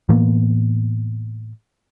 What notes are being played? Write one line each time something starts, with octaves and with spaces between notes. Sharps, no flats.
A2 E3 A#3 B3